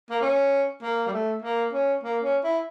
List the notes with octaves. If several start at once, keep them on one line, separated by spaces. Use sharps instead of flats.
A#3
C#4
A#3
G3
A3
A#3
C#4
A#3
C#4
E4